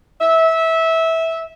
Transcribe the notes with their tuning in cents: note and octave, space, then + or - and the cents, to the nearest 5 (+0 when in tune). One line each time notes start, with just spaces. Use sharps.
E5 -20